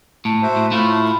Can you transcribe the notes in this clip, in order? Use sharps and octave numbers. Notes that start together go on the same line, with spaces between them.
A2 A5
F#4 C5 E5
A2
A2 A3 E4 F4
B5